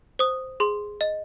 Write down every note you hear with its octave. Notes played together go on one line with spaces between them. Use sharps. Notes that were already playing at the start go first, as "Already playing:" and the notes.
C5 D#6
G#4 C6
D#5